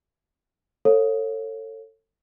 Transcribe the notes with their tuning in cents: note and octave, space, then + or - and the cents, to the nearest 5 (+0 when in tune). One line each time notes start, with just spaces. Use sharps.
A4 +25 C#5 -25 F5 +0